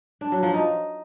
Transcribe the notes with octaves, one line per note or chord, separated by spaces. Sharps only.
D4
F#3
F3
D#4